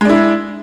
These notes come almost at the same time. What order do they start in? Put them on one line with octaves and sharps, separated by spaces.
G#3 D4 E4